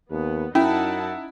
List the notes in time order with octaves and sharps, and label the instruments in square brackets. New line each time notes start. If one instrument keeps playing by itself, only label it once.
[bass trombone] D#2 [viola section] B3
[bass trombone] F#2 [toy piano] C#4 [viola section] D#4 F#5 A5 [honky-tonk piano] E4